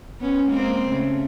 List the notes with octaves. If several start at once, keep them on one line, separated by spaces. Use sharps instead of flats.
B3 C#4
G#3 A#3 C4
C#3 A3